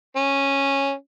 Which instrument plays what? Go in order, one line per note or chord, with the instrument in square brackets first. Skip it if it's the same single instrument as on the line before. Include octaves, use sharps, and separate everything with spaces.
[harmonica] C#4